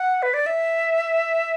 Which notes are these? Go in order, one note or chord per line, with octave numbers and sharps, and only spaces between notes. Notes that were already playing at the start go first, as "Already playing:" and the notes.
Already playing: F#5
B4
D5
E5